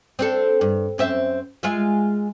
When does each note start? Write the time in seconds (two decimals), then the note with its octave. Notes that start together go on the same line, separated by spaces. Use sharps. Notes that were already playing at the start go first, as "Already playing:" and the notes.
0.19 C4 D4 A4
0.61 G2
0.98 F#2 C4 E5
1.63 G#3 F4 E5